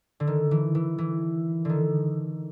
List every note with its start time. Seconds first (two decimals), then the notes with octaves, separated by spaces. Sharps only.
0.20 D3
0.27 D#3
0.51 E3
0.75 E3
0.98 E3
1.65 D3 D#3